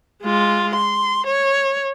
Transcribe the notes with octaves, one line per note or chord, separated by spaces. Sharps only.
G#3 F4
C6
C#5